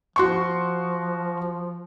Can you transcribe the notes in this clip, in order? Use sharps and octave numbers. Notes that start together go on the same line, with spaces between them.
F3 F#4 C6 C#6